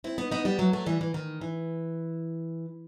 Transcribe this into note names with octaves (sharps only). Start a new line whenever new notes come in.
C4 E4
B3 D#4
B3 D#4
G3 B3
F#3 A3
F#3 A3
E3 G3
E3
D#3
E3